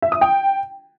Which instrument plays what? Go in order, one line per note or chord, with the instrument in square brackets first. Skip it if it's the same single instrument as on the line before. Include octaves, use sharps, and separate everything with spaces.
[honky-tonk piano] E5
D#6
G5